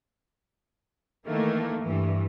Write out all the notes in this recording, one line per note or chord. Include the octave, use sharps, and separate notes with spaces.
D#3 E3 A3 A#3
G2 E3